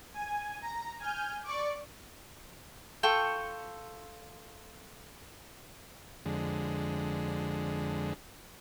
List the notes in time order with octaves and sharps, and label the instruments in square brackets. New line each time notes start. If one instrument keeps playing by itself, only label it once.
[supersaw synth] G#5
A#5
G#5 F6 G6
D5 C#6 D6
[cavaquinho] F4 A4 G5 C#6
[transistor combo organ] F2 D3 G#3